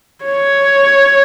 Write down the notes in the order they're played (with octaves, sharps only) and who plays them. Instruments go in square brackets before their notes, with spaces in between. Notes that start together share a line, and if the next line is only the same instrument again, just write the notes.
[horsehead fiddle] C#5